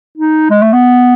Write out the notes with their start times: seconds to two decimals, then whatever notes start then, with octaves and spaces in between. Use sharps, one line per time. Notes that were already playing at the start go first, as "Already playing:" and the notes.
0.18 D#4
0.50 G#3
0.62 A3
0.73 B3